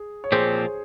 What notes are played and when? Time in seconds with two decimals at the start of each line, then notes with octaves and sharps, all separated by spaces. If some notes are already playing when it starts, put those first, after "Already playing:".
Already playing: G#4
0.24 C#5
0.32 A#2 F3 C4 G4 G#4 C5